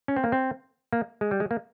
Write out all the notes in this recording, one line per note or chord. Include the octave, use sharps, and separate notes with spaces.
C#4
C4
A#3
C4
A#3
G#3
G3
G#3
A#3